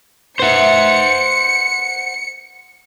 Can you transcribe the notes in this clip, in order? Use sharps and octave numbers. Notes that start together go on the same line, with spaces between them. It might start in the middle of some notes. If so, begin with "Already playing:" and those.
B4 C5 E5 F#5 C#7